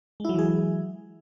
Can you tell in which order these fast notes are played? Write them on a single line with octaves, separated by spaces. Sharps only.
G#3 E4 F#3 E3 G#4